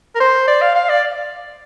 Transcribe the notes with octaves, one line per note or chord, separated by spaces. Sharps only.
A#4
C5
D5
F5
F5
D5